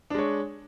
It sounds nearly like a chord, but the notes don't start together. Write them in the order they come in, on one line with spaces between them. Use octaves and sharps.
D4 G#3 C#5